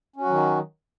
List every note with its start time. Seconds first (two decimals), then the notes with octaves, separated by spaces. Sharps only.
0.16 C#4
0.21 F#4
0.26 F#3
0.30 D#3